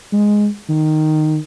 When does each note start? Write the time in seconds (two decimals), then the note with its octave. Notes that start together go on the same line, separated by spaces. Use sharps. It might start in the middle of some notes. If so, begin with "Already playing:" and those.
0.13 G#3
0.69 D#3